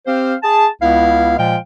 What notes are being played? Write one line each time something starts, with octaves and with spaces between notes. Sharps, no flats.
C4 G4 C5 F5
G#4 A5
C#2 B3 E4 F5
A#2 F3 G#3 F5 G5